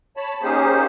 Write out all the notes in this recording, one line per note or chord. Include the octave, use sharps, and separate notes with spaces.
C#5 A5 B5
A#3 C#4 D#4 G4 G#4 C5